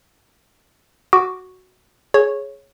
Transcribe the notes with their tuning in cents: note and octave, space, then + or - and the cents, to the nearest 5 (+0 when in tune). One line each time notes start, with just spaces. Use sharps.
F#4 +0 D6 +0
G#4 +10 C#5 -10